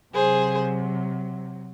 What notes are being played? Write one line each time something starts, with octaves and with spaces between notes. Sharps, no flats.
C3 F#3 G#4 C5